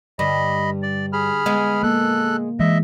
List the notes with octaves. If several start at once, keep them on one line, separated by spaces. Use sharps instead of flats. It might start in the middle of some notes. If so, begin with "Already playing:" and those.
G2 D3 G3 D#5 B5
D5
G#4 B5 F6
G#3 B3
A#3 A4 F#6
E3 G#3 D#5 E5